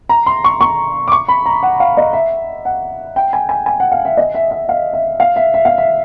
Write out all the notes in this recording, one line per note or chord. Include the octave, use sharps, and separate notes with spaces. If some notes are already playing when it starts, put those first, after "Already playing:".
A#5
C6
C#6
C#6
D6
C#6
B5
A#5
F#5
F5
D#5
E5
F#5
G5
G#5
G#5
G#5
F#5
F5
E5
D#5
E5
E5
F5
E5
F5
E5
E5
F5
E5